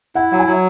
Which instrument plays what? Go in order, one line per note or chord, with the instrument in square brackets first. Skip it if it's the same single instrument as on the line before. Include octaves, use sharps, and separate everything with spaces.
[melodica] E4 [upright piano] F#5
[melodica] F#3 [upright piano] F#5
[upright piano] G#5
[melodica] F#3